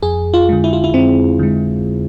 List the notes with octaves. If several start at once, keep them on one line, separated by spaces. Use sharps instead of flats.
F2 G#4
F4
D3 G#3
E4
F4
E4
F2 C4
D3 G#3